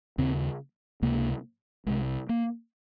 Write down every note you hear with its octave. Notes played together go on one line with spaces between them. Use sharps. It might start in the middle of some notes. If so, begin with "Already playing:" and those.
D#2 C#3 C4
C#2 C3 A#3
C2 C3 G#3
A#3